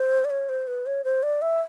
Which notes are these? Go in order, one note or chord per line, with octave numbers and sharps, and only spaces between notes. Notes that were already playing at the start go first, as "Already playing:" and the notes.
Already playing: C5
D5
C#5
C5
B4
C#5
C5
D5
E5